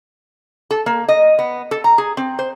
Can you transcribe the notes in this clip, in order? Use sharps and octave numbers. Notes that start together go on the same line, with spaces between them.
A4
A#3
D#5
B3
A4
A#5
G#4
C4
C5